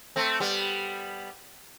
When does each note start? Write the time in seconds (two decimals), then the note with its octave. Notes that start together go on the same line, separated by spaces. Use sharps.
0.16 A3 C4
0.40 G3 B3